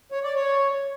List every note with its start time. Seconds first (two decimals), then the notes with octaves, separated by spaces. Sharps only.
0.12 C#5
0.24 D5
0.36 C#5